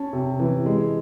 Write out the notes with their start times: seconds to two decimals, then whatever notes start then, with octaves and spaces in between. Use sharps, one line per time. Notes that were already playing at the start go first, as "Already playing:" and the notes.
Already playing: C#4 A5
0.13 C3
0.39 E3
0.66 G#3